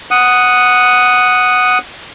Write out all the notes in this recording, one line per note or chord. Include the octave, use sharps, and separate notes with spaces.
F#5 D#6